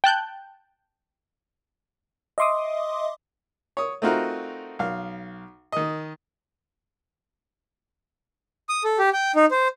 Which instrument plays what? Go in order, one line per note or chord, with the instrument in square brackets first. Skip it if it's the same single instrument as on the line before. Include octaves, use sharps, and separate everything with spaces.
[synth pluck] G5 A5 F#6 G6
[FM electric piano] D#5 E5 C6 D6 D#6
[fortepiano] C#5 D#6
A3 C4 D#4 F4 F#4 A#4
B1 F5
D#3 D#5
[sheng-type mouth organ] D#6
A4
G4
G5
D#4
C5